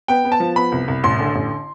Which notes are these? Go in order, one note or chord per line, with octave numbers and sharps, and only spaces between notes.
B3 G5
B3
A5
F3
B3 B5
C2
C2
A1 C6
D3
A1